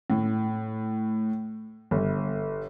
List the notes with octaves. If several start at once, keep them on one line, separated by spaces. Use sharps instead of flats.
A2
G1